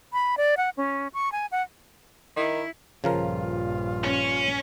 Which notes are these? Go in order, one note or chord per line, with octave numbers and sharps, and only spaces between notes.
B5
D5
F#5
C#4
C#6
G#5
F#5
D#3 E4
A#1 G2 C#3 F3 F4 A#4
C#4